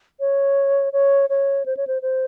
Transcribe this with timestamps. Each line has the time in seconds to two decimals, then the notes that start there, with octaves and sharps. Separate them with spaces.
0.20 C#5
0.93 C#5
1.30 C#5
1.66 C5
1.77 C#5
1.87 C5
2.02 C5